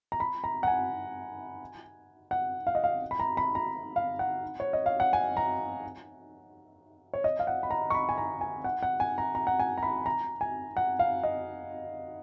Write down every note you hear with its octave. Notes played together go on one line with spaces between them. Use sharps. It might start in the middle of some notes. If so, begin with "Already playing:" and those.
A#5
B5
A#5
F#5
G#5
F#5
F5
D#5
F5
B5
A#5
B5
A#5
F5
F#5
C#5
D#5
F5
F#5
G#5
A#5
C#5
D#5
F5
F#5
B5
A#5
C#6
B5
G#5
A#5
G#5
F#5
F#5
G#5
A#5
A#5
F#5
G#5
A#5
B5
A#5
G#5
F#5
F5
D#5